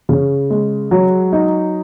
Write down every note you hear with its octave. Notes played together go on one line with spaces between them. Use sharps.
C#3
G#3
F#3
D#4